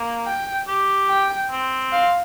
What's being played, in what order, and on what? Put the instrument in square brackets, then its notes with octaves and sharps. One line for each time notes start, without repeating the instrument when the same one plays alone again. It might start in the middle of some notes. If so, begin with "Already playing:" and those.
Already playing: [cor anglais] A#3
[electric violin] G5
[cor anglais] G4
[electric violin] G5
[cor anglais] C4
[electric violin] F5